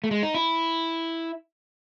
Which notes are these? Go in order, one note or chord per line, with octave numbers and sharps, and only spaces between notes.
A3
G#3
D#4
E4